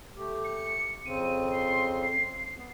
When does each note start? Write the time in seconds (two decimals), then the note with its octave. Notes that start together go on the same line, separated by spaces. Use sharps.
0.17 A3 G4
0.44 C#7
1.05 F2 C#3 C4 D#7
1.50 C6
2.02 C7
2.57 B3